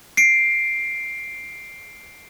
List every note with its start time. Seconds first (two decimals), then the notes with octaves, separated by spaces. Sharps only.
0.17 C7 D7